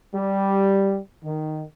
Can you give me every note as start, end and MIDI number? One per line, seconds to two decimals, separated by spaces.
0.15 0.99 55
1.24 1.62 51